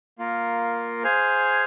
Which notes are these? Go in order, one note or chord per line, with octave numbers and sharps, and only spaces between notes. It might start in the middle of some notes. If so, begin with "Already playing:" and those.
A#3 F4 A#4
G#4 C5 F5 G#5